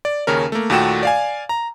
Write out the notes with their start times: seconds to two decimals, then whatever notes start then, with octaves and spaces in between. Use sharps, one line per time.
0.05 D5
0.27 D#2 C#3 C#4 A#4
0.52 A3 A#3
0.70 D#2 A#2 A3 F#4 G5 E7
1.03 D5 F5 G#5
1.49 A#5